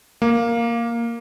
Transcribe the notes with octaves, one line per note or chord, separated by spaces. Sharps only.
A#3